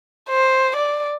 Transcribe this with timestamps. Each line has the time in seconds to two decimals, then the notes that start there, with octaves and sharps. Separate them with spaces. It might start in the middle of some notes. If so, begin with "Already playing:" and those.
0.29 C5
0.76 D5